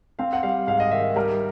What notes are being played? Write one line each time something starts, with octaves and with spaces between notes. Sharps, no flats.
C4 F5
F#5
G3 F5
G#2 F5
D#5
D#3 E5
G3 A#4